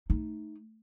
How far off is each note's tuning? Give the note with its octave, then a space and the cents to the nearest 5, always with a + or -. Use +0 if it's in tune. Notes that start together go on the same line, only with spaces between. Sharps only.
A3 +0 D#4 +0